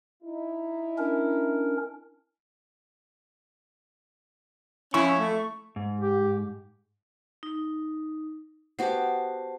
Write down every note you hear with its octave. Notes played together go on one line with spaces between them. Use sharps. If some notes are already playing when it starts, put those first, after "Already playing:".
D#4 E4
C#4 D4 A#4
F2 C#4 E4 C#6
A3
G#2
G4
D#4
B3 F#4 G4 C5 A5